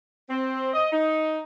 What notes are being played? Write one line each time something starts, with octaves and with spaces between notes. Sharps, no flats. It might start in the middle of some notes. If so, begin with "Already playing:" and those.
C4
D#5
D#4